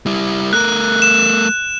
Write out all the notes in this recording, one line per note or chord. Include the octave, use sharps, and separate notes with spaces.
G3 E4
A3 A#4 F#6
E7